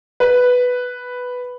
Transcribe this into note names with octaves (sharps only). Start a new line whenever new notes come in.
B4